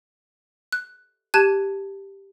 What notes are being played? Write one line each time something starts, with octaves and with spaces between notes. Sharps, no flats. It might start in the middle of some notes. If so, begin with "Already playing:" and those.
F#6
G4 A5 F#6 G#6 D#7